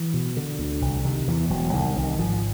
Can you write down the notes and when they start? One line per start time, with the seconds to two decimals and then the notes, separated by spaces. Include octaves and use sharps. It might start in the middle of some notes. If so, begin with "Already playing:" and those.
Already playing: E3
0.14 B2
0.37 D3
0.59 D2
0.82 C2
1.05 C3 D#3
1.27 E2 E3
1.50 E1 F#3
1.73 C2 D#3
1.96 C2 D#3
2.19 G#1 F3